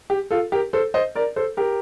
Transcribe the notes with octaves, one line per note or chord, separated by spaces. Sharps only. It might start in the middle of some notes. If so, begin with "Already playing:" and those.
G4
F4 A4
G4 A#4
A4 C5
C5 D#5
A#4 D5
A4 C5
G4 A#4